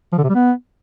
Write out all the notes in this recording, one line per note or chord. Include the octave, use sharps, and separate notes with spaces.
F3
D3
C3
G3
B3